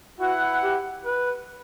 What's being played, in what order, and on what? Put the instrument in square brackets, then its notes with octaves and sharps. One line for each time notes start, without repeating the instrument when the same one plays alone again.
[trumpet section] E4 B4 F#5 [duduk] F#4
[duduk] G4
B4